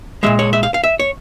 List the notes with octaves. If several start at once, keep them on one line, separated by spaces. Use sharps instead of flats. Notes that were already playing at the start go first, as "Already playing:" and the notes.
A#2 F3 G#3 E5
C#5
E5
F5
F5
E5
C#5